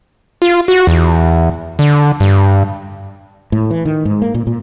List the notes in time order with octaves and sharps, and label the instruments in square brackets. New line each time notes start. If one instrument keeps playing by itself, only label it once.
[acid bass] F4
F#4
E2
D3
G2
[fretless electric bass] A2
E3
D#3
G#2
A#3
A#2
A#2